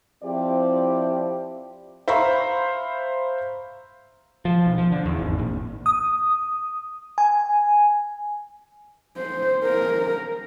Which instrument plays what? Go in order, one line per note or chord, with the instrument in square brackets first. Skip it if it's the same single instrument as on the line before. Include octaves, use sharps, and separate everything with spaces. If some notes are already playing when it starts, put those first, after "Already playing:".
[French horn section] F3 C4 E4 G4 C5 D5
[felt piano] C5 E5 F5 A#5 B5 C#6
[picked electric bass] F3
B1
F3
D3
E2
G#1
A#1
[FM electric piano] D#6
G#5
[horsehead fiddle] C5
A#4